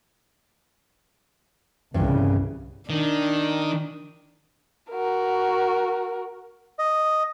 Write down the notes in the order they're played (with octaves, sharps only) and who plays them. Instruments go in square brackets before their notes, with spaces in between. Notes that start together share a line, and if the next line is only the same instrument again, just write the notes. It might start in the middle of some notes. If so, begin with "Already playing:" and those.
[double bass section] G1 C2 C#3 [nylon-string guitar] G2 E3 C#4
[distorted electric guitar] D#3 [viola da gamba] D4
[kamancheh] F#4 A#4
[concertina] D#5